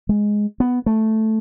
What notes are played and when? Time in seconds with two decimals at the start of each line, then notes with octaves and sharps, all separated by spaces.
0.09 G#3
0.60 B3
0.86 A3